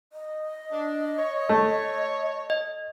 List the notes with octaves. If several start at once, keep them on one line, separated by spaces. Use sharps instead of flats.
D#5
D4
C#5
A3
D#5